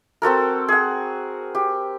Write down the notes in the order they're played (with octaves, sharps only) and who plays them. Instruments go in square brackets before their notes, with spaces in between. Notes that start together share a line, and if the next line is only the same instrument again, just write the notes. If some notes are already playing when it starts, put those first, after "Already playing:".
[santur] C4 F#4 A4 A#4
G#4 F#5
G4